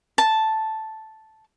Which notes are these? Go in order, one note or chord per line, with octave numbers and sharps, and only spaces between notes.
A5